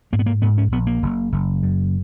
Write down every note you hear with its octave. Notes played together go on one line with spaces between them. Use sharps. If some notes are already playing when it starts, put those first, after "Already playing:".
G#2 A#3
B3
A#3
G#2 B3
C#4
A#1 B3
A#3
F#1
F#1
F#2